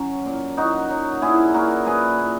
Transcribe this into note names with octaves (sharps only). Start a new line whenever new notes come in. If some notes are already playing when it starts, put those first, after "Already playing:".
Already playing: F#3 C#4
A#2
A#2 D#4 F#4
F#3
A#2 E4 G#4
A#2 F#4 A#4
A#2 G#4 B4
A#2